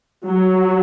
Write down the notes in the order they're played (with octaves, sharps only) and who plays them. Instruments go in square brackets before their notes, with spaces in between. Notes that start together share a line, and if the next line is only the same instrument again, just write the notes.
[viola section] F#3